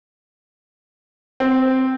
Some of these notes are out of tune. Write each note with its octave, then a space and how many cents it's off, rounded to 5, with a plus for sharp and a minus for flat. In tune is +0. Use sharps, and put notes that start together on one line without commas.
C4 -5